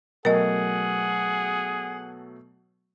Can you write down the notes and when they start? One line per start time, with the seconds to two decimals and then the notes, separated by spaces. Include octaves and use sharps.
0.25 B2 F#3 A3 G#4 A#4 D#5 F#5